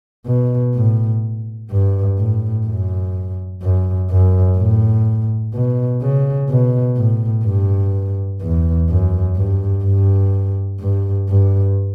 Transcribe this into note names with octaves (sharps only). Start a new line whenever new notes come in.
B2
A2
G2
A2
F#2
F#2
F#2
A2
B2
C#3
B2
A2
G2
E2
F#2
G2
G2
G2
G2